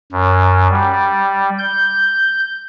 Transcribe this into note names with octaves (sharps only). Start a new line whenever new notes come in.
F#2
G3
G6